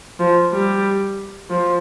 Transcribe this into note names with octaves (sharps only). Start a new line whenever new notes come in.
F3
G3
F3